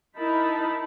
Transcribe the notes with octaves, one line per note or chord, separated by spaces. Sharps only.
D#4 E4 A#4 A5 B5